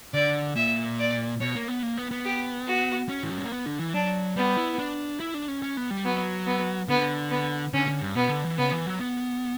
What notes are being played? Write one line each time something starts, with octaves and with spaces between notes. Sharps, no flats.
D3 D5
A#2 E5
D5
B2 C#5
A#3
B3
A#3
B3
B3
G4
F#4
C#4
E3
F#3
G3
A#3
B3
D3
E3
F#3 D4
G3 B3
E4
D4
E4
D4
C#4
C#4
B3
G3
F#3 B3
B3
D3 B3
B3
D3 C#4
D3
G2
B2 B3
D3
E3
C#3 B3
E3
F#3
B3